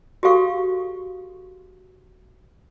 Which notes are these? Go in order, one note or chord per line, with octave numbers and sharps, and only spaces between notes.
F#4 G4 A4 F5 C#6